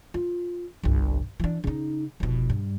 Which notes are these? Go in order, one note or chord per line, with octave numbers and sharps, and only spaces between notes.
F4
G1 C2
E3 D4
C#3 D#4
F1 B2
G2